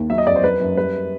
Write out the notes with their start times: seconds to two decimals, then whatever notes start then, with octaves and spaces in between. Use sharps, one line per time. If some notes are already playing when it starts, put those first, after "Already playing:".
Already playing: D#2
0.10 F#3 E5
0.18 D#5
0.27 F2 D5
0.36 C5
0.44 F#3 B4
0.61 F#2
0.77 G3 B4